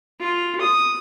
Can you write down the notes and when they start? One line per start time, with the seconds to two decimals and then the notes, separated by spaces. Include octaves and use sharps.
0.20 F4
0.61 D#6